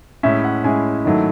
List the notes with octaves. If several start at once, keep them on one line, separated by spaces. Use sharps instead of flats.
A2 G#3 C#4 E4 E5
F#5
A2 G#3 C#4 E4 G#5
G#2 D#3 F#3 A3 E4